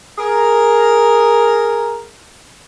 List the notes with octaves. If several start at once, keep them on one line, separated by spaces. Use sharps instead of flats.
G#4 A#4